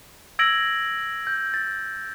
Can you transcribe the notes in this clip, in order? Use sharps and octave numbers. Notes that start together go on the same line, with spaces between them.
E6 G#6 A#6 D7 F#7
G6
A6